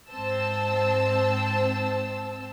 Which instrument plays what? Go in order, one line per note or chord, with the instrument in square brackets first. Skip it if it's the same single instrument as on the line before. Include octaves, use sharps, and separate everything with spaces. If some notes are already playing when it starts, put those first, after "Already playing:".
[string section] G#2 C4 C5 A5 E6